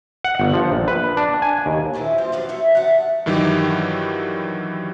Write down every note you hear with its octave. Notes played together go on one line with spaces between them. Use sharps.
F#5
G1
F3
A#1
B4
D4
G#5
D#2
F2 A#2 F3 D4 E4
F#2 G3 C4 F4 C5
G#2 D#3 F3 F#3 D4 G4
F#3 D#4 C#5 E5
D#3 G3 E5 F#5 A5
G2 D#3 E3 F#3 D#4 G4